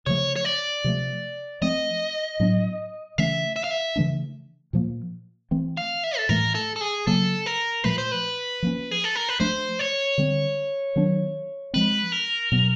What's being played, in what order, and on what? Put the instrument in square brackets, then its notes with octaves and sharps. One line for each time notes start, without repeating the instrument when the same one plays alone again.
[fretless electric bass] C#3 F3 A3 [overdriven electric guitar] C#5
[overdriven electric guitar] C#5
D5
[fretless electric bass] C3 F3 A3
[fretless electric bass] F3 A3 C4 [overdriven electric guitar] D#5
[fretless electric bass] A2 F#3 B3 D4
[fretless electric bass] C#3 E3 A3 C#4 [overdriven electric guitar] E5
[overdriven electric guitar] E5
F5
E5
[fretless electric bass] C#3 E3 A3 D4
A#2 F3 A#3
E3 A3 C4
[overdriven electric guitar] F5
E5
A4
[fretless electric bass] A2 E3 A3 [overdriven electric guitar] A#4
[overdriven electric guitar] A4
A4
G#4
[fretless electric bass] C#3 F#3 A#3 [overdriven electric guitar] A4
[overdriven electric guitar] A#4
[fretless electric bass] A#2 F3 A3 [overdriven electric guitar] B4
[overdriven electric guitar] C5
B4
[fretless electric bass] F3 A#3 C#4
[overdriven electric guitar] G#4
A4
A#4
B4
[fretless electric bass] F3 A3 D4 [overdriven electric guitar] C5
[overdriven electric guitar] C#5
[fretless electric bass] D3 G3 C4
D#3 F#3 B3 D4
[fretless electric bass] F3 G#3 C4 [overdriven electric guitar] B4
[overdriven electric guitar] A#4
[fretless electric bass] B2 F#3 B3